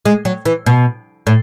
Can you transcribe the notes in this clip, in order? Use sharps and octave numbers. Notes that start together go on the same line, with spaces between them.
G#3
F#3
E3
B2
A2